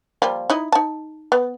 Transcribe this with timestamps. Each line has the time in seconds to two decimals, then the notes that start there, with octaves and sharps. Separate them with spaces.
0.22 F3 G3 A#3
0.50 D#4 E4 D#5
0.72 D#4 A5
1.32 B3